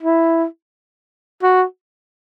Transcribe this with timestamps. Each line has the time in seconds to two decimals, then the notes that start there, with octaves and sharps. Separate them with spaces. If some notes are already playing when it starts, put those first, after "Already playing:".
0.02 E4
1.42 F#4